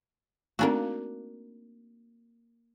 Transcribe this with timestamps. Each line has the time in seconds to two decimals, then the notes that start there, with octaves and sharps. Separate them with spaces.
0.59 A3 A#3 C4 D4 D#4 F#4